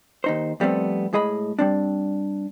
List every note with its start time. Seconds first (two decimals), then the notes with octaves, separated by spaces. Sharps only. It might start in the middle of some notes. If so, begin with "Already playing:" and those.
0.24 D#2 D#4 C5
0.60 F2 G3 A3 B3 C4
1.13 A2 G#3 G#4 D#5 A#5 B5
1.59 G3 C4 D4